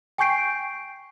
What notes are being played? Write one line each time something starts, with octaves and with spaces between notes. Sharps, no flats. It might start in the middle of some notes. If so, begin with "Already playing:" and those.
G5 G#5 C#6 G6 C7 D7